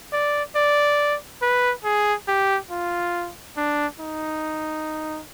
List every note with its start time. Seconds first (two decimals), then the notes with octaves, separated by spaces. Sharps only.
0.13 D5
0.56 D5
1.42 B4
1.84 G#4
2.28 G4
2.70 F4
3.57 D4
4.00 D#4